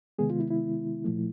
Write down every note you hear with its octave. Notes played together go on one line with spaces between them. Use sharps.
C3 D#3 G#3 B3 G#4
F4
E4
E4
A#2 F3 A3